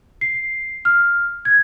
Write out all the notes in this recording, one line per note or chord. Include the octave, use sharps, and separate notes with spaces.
C7
F6
G#6